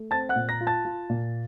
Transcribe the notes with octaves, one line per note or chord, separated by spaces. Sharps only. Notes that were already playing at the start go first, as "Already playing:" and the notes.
Already playing: A3
C4 A5 A6
F#5 F#6
A#2
A#5 A#6
F4
A5 A6
F4
A#2